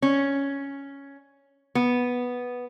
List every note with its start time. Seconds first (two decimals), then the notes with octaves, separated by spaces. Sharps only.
0.02 C#4
1.75 B3